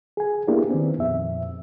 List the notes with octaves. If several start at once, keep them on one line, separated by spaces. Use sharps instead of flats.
G#4 G#5
A#3 B3 D4 E4 G4 G#4
D#3 B3 C4
F2 A#2 E5